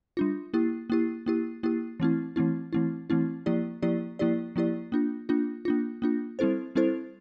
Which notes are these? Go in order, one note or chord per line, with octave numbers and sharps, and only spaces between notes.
G3 D4 F4
A#3 E4 G4
A#3 E4 G4
A#3 E4 G4
A#3 E4 G4
E3 A3 C4 E4
E3 A3 C4 E4
E3 A3 C4 E4
E3 A3 C4 E4
F3 A#3 E4 G4 D5
F3 A#3 E4 G4 D5
F3 A#3 E4 G4 D5
F3 A#3 E4 G4 D5
A#3 D4 F4
A#3 D4 F4
A#3 D4 F4
A#3 D4 F4
G3 C4 E4 A4 C5
G3 C4 E4 A4 C5